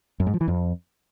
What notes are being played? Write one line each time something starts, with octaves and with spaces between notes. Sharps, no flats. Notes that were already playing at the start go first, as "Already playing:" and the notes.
F#2
G#2
F3
E3
F2